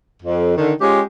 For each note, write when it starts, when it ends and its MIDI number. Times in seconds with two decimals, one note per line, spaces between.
0.23 0.54 41
0.57 0.72 50
0.57 0.72 51
0.81 1.00 56
0.81 1.00 61
0.81 1.00 65
0.81 1.00 67